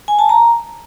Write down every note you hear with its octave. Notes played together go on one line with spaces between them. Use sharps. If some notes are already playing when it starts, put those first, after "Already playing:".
G#5
A5
A#5